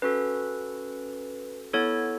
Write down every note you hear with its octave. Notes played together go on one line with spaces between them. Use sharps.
C#4 F#4 A4 B4
B3 E4 A4 C#5